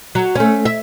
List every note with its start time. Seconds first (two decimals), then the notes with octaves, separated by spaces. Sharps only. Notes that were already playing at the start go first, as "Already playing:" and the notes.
0.15 F#3
0.35 A3 C#4
0.65 E5